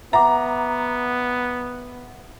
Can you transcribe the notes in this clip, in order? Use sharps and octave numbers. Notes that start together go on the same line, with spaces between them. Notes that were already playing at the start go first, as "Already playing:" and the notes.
B3 E5 F#5 A#5 D6